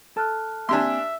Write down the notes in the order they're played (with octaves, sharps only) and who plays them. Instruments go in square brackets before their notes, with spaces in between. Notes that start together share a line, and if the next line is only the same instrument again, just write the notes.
[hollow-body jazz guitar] A4 [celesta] A5 F6 F#6
[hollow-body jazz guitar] A#3 C4 G#5 [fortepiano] D4 G4 C6 [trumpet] E5